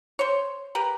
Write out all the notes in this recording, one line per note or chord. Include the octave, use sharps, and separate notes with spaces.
C5 C#5
G4 A#4 B4